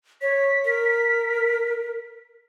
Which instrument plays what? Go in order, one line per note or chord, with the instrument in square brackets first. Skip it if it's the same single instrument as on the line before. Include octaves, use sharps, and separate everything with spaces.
[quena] C#5 [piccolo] B6
[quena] A#4